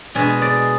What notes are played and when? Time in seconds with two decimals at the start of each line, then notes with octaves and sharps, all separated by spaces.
0.15 B2 G#3 D4 G#4
0.42 D5